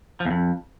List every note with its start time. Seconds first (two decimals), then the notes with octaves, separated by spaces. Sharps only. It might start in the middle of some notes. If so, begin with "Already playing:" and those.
0.20 F3
0.25 E2
0.31 F2